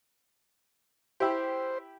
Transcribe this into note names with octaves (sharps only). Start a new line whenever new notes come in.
E4 G4 C5